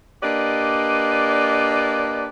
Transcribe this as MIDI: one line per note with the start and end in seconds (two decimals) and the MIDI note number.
0.23 2.28 58
0.23 2.28 62
0.23 2.28 67
0.23 2.28 71
0.23 2.28 74
0.23 2.28 75